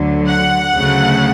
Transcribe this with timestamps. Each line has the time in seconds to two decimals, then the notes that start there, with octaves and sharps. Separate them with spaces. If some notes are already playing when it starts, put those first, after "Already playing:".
Already playing: D2 D3 F#3
0.29 F#5
0.76 D2 C#3 F#3 A3